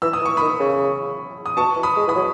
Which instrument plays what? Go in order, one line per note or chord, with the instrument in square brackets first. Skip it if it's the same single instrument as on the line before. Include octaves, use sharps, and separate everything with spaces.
[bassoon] E3 [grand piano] E6
[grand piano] D#6
[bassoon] E3
[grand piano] C#6
[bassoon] D#3 [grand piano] B5 D#6
[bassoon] C#3
[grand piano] D#6
[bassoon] B2 [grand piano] A5 C#6
[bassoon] E3
[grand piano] B5 D#6
[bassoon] G#3
[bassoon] E3 [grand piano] B5 D#6
[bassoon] F#3